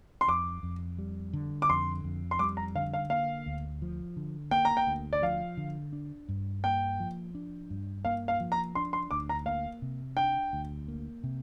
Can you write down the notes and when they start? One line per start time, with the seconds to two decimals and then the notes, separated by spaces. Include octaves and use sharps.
0.21 C6
0.28 F2 D6
0.63 F2
0.99 G3
1.33 D3
1.62 D6
1.70 F2 C6
2.04 F2
2.31 C6
2.39 G3 D6
2.57 A#5
2.75 D3 F5
2.94 F5
3.10 A#3 F5
3.46 D2
3.82 F3
4.17 D3
4.51 A#3 G5
4.65 A#5
4.77 G5
4.87 D2
5.13 D5
5.22 F3 F5
5.57 D3
5.93 D4
6.29 G2
6.64 A#3 G5
7.00 F3
7.35 D4
7.70 G2
8.05 A#3 F5
8.28 F5
8.40 F3
8.52 A#5
8.75 D4 C6
8.93 C6
9.11 D2 D6
9.29 A#5
9.46 A#3 F5
9.82 C3
10.17 D4 G5
10.53 D2
10.88 A#3
11.24 C3